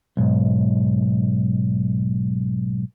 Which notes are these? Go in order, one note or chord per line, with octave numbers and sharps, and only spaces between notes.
B1 G#2